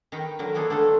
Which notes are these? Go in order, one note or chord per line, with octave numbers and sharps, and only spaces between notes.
D#3 D#4 A#4 B4 G5
D3 F#3 A#4
F3 A#3 B3 D4 G#4 A4
D3 G3 A3 D4 F4 A4